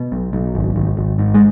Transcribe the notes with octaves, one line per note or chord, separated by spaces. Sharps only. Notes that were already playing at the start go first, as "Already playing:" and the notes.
Already playing: B2
B1
B1
G#1
G#1
G#1
G#2
G#3